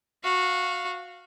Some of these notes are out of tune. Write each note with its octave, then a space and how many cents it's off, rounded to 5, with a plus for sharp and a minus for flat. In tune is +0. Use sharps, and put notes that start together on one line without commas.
F#4 -15 F5 +0